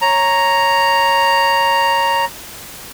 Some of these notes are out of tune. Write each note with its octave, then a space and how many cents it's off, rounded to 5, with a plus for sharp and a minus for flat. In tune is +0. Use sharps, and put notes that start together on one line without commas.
C#5 -5 A#5 +0